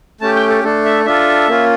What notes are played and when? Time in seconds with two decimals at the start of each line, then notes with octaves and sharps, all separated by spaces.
0.21 A3 C#4 G4 A5
0.35 G5
0.49 A4
0.64 A3 D4 A4
0.85 E5
1.05 D4 F4 A4 E5
1.48 A#3 C#4 F4